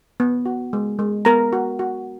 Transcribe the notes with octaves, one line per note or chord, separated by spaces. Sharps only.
B3
F#4
G#3
G#3
B3 A#4 A#5
F#4
F#4